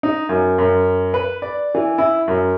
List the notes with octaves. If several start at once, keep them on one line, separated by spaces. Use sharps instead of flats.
D#4
F#2
F#2
B4
D5
E3
E4
F#2